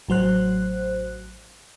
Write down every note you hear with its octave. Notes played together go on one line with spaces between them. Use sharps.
A1 F#3 C5 F#6